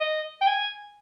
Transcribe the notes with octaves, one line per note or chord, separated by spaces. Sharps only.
D#5
G5
G#5